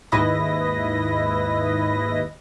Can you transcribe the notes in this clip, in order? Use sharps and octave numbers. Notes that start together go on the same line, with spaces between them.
D#2 G#2 E4 B4 D#5 A#6